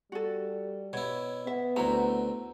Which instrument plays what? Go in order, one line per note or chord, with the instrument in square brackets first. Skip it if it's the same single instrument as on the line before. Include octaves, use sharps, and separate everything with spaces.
[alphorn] G3 [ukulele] F#4 A4
[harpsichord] B2 E4 [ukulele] C#5
[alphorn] B3 [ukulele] E5
[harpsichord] D2 C4 [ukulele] E4 F#4 A#5